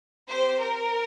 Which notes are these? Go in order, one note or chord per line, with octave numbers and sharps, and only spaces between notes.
C4 G4 C5
A#4